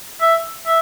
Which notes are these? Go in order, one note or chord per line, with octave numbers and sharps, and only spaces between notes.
E5
E5